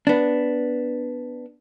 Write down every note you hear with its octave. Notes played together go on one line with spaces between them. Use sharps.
B3 D4